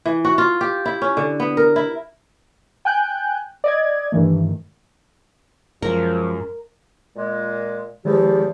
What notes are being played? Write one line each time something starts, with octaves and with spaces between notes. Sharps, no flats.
E3
F#4
F4
G4
E4
C#4
D3
B3
A#4
E4
G5 G#5 F#6 G6
D5 D#5 G#6
G2 D#3 E3 A3
F#2 F3 G#3 A#4
A#2 G#3
E2 D#3 F3 G#3 G4